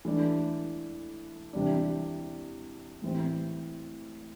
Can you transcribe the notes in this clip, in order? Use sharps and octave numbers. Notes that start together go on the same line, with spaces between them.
E3 A3 D4
C3 E3 G3 D4
A2 E3 G3 C4